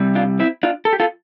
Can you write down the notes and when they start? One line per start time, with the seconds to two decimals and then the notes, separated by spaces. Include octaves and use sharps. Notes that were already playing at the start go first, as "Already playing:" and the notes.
Already playing: C3 G3
0.15 D4 F4
0.39 C4 E4
0.63 D4 F4
0.85 A4
0.93 G4
1.00 F4 A4